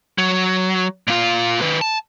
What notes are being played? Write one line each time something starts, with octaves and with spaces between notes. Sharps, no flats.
F#3
A#2 F4
D#3 B4
A5